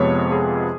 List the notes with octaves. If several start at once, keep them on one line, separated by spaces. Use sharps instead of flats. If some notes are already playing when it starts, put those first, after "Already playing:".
Already playing: F2 C3 F3 G#3 B3 C#5
G#4